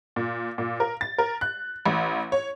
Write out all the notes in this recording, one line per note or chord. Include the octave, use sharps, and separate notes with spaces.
A#2
A#2
A#4
A6
A#4
F#6
A1
C#5